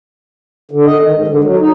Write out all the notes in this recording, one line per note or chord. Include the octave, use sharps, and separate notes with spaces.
D3
D#5
D#3
G#2
D3
F#3
D#4